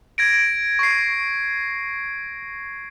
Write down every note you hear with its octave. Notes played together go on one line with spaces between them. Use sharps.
G#6 A#6 D7
C#6 C7